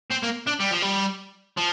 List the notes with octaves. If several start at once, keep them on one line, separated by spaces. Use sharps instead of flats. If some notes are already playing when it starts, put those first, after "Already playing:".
C4
A#3
D4
G3
F3
G3
F3